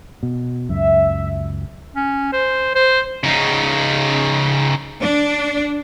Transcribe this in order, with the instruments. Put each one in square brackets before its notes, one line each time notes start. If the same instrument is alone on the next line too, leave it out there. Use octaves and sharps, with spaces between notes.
[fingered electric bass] B2
[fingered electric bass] C#2 F#2 [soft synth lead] E5
[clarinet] C#4
C5
C5
[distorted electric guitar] C#3 D#4
[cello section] D4